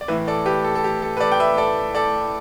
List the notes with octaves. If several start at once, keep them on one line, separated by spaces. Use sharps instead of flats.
D5
A2 E3 B4 E5
A4 D5
G4 B4
A4
A4
G4
A4
B4
A4 D5
G5
B4 E5
A4 D5
A4 D5